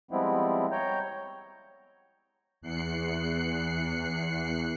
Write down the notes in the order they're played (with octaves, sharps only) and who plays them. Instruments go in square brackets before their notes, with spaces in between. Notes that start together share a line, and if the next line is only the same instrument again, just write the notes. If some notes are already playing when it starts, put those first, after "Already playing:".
[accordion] F3 G3 G#3 B3 C4 E4
C#5 G5 A#5 G6
[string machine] E2 F#6 C7 C#7